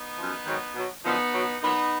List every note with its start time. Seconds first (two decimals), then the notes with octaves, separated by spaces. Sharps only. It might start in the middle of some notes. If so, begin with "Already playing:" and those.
Already playing: B3 D#4
0.17 F#2 F3
0.45 G#2 D#3 F#3
0.74 B2 F#3
1.03 F#2 D3 F3 B3 D#4
1.32 B2 F#3
1.61 A#2 F#3 B3 D#4